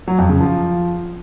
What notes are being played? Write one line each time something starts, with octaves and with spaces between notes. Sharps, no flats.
F#3
F2
C#3
F3